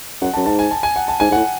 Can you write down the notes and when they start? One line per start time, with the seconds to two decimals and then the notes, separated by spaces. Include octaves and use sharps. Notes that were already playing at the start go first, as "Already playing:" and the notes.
0.21 F#2 F#5
0.33 F#2 A5
0.46 G#2 A5
0.59 G#5
0.71 A5
0.83 G#5
0.96 F#5
1.08 A5
1.20 G#2 G#5
1.30 G#2 F#5
1.37 A2